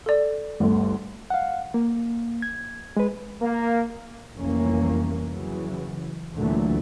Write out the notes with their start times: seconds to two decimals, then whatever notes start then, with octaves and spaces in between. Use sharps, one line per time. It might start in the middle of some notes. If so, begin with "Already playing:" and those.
0.06 A4 D5
0.60 G1 D2 A3
1.30 F5 F#5
1.74 A#3
2.42 G#6
2.97 G#3 B4
3.41 A#3
4.36 F1 C2 E3 A#3 C#4
5.30 C#3 E3 F#3
6.35 D2 A#2 D3 E3 F#3 A3